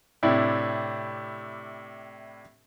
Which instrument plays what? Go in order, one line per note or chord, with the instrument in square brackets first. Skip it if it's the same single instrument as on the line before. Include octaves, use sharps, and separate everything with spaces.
[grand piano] A2 C3 D4 E4 G4